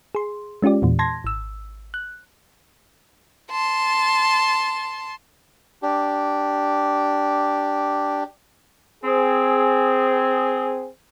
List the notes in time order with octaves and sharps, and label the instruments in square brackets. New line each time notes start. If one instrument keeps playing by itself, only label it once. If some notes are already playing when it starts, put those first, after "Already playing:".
[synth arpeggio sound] G#4 C6
G#3 C#4 F4 G4 D5
E2 A#2 E3
A5 C6 G#6 A#6
G#1 E6
F#6
[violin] A5 C6
[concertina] D4 G4
[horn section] C4 G#4